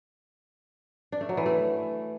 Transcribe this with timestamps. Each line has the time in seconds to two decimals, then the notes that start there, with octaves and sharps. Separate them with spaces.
1.12 D4
1.21 A3
1.29 F#3
1.37 E3
1.46 A3